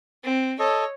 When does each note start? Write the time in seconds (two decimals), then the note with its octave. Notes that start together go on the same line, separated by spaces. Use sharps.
0.24 C4
0.60 A4 C#5 D#5